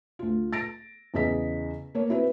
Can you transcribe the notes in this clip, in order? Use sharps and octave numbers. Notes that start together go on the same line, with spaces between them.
D2 F4
A6 A#6 D7
E2 C#3 G#4 D#5 B6
A#3 C#5
C4 E4 F#4 B4